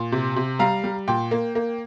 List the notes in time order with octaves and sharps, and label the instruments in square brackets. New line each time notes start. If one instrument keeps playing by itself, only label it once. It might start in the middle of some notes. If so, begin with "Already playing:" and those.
Already playing: [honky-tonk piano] A#2
C3
C3
G3 F5 A#5
G3
A#2 G5
A#3
A#3